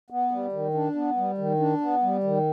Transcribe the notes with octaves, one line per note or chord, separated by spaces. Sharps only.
B3
G3
D#3
D4
B3
G3
D#3
D4
B3
G3
D#3